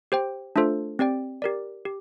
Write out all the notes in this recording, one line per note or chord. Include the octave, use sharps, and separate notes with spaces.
G4 C5 G5
A3 D4 F4 A4 C5
C4 G4 D5 G5
G4 A#4 D5
G4